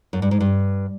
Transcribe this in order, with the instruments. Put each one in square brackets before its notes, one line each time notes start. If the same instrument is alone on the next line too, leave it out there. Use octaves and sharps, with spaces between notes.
[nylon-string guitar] F#2
G2
G#2
G2